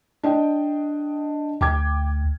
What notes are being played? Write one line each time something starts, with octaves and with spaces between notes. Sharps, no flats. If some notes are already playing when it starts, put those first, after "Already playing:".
D4 D#5 G5
D2 G5 D6 G#6